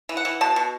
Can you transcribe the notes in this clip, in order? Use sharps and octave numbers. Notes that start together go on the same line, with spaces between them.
E3
F#5
E3
B2 A5
B2